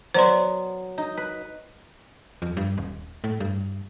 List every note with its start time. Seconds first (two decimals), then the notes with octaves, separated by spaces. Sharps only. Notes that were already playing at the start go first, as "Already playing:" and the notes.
0.14 F#3 B3 C5 D5 C6
0.98 D#4
1.17 B4
2.42 F2
2.57 G2
2.78 D#1
3.24 A2
3.40 G2